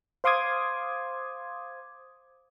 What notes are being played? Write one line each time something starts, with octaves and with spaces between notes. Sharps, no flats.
C5 F5 C6 D6 D#6 G#6